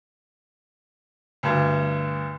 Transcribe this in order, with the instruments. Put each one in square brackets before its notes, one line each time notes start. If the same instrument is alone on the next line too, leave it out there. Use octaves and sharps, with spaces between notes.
[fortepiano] D2 G2